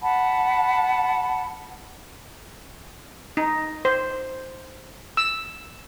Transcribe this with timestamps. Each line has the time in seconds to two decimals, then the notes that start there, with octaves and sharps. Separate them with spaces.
0.02 F#5 A5 B5
3.37 D#4
3.85 C5
5.17 E6